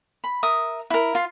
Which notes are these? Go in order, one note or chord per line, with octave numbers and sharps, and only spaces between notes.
B5
A#4 E5 D#6
E4 A#4
F4